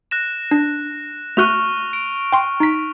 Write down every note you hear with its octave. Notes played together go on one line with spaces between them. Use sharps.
F#6 A#6 E7
D4
A3 F#4 C#6 F6 F#6 F7
D7
G5 C6
D#4 B6